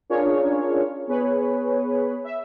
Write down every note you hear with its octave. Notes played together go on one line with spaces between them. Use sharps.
C#4 D4 F4 G#4 A#4 C#5
B3 G#4 B4 C#5
E5